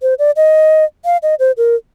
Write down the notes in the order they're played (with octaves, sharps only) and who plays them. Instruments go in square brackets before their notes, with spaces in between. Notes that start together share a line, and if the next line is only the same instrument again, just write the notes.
[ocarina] C5
D5
D#5
F5
D#5
C5
A#4